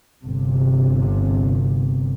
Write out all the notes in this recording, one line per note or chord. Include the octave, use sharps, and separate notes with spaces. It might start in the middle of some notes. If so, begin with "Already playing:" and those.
G1 C3